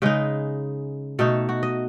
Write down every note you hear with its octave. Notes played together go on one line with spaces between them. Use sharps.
C#3 G#3 D#4 B4
B2 A3 D#4 A4
F#4
D#5